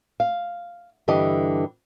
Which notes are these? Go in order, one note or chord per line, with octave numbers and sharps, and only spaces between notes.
F5
G2 D3 E3 G4 D#5